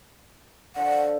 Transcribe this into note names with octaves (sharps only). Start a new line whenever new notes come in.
D3 F3 F#5